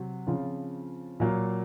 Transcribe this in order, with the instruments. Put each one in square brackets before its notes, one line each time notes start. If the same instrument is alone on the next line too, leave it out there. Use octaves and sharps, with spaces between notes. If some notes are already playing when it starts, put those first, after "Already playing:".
Already playing: [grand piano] C3 F#3
C#3 F3 C4 F4
A#2 F#3 A#3